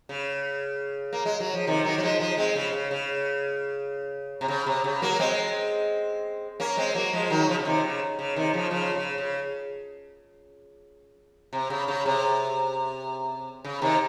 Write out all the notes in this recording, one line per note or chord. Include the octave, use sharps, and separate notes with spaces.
C#3
A#3
G#3
F#3
F3
C3 D#3
D#3 F#3
F#3
F3 G#3
F3 G#3
G#3 C4
C#3
C#3
C#3
C3
C#3
C3
C#3
F#3 A#3
A#3
G#3 C4
A#3 C#4
G#3 C4
F#3 A#3
F3 G#3
D#3 F#3
C#3 F3
C#3
C3 D#3
C#3
C#3
C3 D#3
C#3 F3
C#3 F3
C#3
C#3
C3
C#3
C#3
C3
C#3
C3 D#3